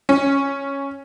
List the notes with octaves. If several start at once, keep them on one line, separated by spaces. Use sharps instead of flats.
C#4